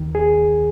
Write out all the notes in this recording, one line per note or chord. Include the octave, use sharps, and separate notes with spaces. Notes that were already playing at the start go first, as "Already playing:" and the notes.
Already playing: D#2 D#3
G#4